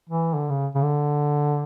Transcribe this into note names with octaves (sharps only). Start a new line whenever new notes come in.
E3
D3
C#3
C#3
D3